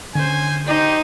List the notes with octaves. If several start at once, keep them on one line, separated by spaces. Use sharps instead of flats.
D3 C#4 D4 C5 G#5
D#4 G4 C5 D#5